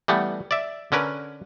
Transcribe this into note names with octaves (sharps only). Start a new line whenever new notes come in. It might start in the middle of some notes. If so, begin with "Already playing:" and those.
E3 G3 A3 B3 F#5
D5 E5
D3 C#4 A#4 B4